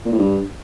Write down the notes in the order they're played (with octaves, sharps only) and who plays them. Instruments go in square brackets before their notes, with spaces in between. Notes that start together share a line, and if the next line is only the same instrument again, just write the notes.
[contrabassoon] A#2
A2
G2